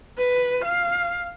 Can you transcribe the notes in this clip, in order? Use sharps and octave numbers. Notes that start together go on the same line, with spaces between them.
B4
F5